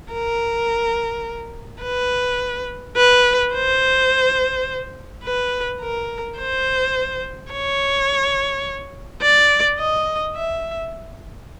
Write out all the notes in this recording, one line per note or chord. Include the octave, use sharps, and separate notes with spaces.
A#4
B4
B4
C5
B4
A#4
C5
C#5
D5
D#5
E5